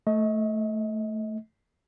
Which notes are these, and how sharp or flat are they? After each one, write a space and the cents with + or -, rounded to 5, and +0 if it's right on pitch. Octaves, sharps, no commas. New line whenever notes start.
A3 +0 D#5 +35